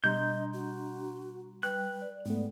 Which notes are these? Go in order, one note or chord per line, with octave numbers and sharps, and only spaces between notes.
B2 G3 D4 D#5 A#5 C6 G6
F#4
G3 B4 G5 F#6
D5
G#2 A3 B3